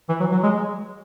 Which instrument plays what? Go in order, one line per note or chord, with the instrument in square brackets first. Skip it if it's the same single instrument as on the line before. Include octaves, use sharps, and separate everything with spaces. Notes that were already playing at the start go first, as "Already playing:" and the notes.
[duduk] E3
F#3
F#3
G#3